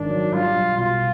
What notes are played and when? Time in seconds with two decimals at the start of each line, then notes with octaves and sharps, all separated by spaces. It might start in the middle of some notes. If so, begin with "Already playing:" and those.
Already playing: G#1 G#2 D#3 D4
0.10 F#3
0.32 G3 F4
0.55 B1
0.77 B2 F4